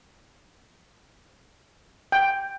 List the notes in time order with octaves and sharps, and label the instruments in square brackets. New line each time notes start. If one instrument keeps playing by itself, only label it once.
[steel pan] G5